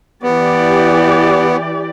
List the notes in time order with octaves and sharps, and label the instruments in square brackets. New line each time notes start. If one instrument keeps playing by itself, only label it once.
[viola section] E3 G4 D5 [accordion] B3